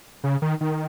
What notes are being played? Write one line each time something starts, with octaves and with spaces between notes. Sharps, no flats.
C#3
D#3
D#3